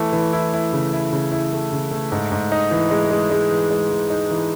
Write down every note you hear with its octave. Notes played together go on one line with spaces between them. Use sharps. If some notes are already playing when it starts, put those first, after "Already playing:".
Already playing: E3 A3
E3
E4
E4
C#3
E4
C#3
E4
A3
C#3
A3
G#2
G#2
D#4
E3
G#3
G#3
G#3
E3
G#3
E3
D#4
E3